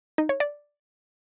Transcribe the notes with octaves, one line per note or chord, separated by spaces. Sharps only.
D#4
C#5
D5